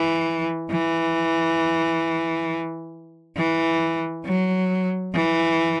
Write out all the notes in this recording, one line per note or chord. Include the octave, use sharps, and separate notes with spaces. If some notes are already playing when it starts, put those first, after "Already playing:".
Already playing: E3
E3
E3
F#3
E3